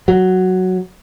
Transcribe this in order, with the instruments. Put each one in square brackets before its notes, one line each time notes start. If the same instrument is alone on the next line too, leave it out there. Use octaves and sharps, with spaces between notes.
[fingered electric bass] F#3